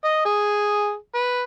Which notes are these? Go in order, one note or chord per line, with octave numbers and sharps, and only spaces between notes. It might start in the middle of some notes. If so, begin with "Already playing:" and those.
D#5
G#4
B4